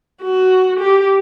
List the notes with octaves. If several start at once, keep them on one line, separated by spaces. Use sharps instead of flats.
F#4
G4